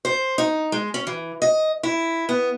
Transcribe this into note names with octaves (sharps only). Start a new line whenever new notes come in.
C5
D#4
G#3
C#4
E3
D#5
E4
B3